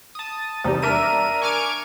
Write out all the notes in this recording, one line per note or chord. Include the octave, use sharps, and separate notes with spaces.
A5 D#6
E2 C3 G3 D#4
D4 A#4 E5 D#7
G#5 C#6 D6 F6 G#6 D7